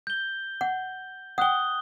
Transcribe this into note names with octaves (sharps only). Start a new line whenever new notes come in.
G6 G7
F#5
F#5 G5 D#6 F#6 G7